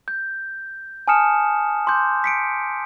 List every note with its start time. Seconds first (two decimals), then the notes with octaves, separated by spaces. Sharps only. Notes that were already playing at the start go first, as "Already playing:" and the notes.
0.08 G6
1.08 G#5 A5 D#6 F6 C#7 E7
1.87 C6 D6 G6
2.24 B6 C#7 D7